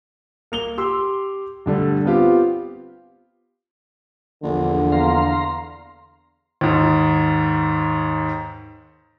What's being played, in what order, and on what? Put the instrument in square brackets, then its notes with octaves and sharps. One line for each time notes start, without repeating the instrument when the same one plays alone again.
[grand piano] A#3 F7 G7
G4 C6 E6
G2 D3 G3 A3
B3 C4 F4 G4
[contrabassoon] A#1 [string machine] E2 [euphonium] D3
[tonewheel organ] F5 A#5 C6
[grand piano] D#2 G#2